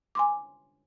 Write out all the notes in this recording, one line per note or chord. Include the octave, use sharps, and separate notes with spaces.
G#5 C6 D6